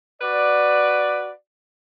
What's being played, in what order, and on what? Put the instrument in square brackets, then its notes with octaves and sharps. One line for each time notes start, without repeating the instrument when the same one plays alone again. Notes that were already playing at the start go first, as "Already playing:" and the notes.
[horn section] F#4 B4 D5